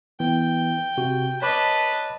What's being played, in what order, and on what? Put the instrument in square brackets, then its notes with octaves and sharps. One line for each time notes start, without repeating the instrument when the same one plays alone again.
[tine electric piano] E3 B3 [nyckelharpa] G5
[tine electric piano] C3 F#4
[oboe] B4 [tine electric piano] C#5 B5 D6 [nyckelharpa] D#5 A5